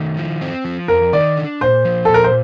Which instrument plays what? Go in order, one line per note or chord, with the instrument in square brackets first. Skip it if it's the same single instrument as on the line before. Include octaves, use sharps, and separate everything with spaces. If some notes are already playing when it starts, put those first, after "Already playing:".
Already playing: [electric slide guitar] D#3 A3
F3
C4
F3
[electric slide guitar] F2 [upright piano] A#4
[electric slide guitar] D#3 [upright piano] D5
[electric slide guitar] D4
[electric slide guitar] A#2 [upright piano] C5
[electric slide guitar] F3
[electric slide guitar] A#2 [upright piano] A4
[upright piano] A#4
C5